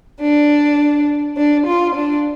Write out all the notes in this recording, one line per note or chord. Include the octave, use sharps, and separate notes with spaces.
D4
D4
F4
D4